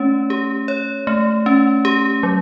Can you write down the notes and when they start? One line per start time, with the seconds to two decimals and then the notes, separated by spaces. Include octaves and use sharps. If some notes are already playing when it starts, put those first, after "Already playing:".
Already playing: A3 C#4 C#5
0.30 G4
0.68 C#5
1.07 A3
1.46 C#4
1.85 G4
2.23 F#3